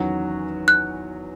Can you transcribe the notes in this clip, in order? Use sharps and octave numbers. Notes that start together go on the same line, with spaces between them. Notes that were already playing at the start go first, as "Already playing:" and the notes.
Already playing: E2 D#3 F#3 C#4 F#4
F#6